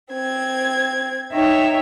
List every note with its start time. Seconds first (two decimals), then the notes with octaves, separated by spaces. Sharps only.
0.12 C4 G#6
1.33 D#4 C#5 E5 G5